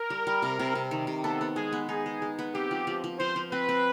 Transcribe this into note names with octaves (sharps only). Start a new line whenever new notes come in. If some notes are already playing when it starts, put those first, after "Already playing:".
Already playing: A#4
G3
G3
C3
C3
C3
D#3
C3
B3 A4
B3
G#3 G#4
B3
D#4 G#4
G#3
G#3
B3
C4 G4
F3
F3
F3
F3 C5
F3
C4 B4
C4